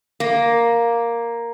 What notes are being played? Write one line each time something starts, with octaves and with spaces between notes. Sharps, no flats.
A#3